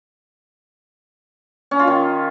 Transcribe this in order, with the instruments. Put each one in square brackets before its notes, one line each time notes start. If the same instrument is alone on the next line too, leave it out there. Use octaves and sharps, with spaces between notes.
[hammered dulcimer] C#4
F4
D#3